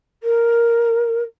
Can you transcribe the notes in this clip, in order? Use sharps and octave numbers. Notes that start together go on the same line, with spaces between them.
A#4